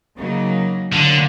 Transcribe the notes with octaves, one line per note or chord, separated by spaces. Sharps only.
C#3 F#3 A#3 D#4
A2 D3 F#3 A#3 D4 F4